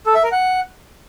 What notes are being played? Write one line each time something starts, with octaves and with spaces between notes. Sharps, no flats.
A4
E5
A#4
F#5